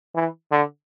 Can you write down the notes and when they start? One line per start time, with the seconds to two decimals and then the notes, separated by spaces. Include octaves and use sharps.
0.15 E3
0.52 D3